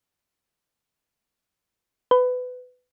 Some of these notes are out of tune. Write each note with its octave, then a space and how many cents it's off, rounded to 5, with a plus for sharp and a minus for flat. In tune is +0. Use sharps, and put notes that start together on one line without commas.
B4 +20